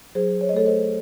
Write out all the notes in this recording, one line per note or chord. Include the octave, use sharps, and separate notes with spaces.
F#3 G#4 C5
C#5
D#5
A3 A4 C#5
C5 D#5